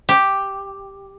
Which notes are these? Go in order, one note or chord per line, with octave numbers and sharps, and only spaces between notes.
G4